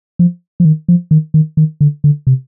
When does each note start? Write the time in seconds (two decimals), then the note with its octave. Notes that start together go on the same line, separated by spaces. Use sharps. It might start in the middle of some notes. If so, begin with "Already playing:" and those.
0.19 F3
0.60 F3
0.65 D#3
0.88 F3
1.11 D#3
1.34 D#3
1.57 D#3
1.81 D3
2.04 D3
2.27 C3